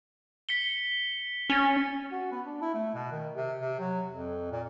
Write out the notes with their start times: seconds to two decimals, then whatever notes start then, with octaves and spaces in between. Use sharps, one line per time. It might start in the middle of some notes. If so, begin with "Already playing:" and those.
0.49 B6 C#7 G7
1.50 C#4 A6 C#7
2.12 F#4
2.32 B3
2.46 D4
2.62 E4
2.74 A3
2.95 B2
3.12 D#3
3.36 C3
3.58 C3
3.80 F#3
4.10 F2
4.51 A#2